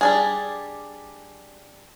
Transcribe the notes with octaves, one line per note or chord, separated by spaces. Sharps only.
G3 D4 G#4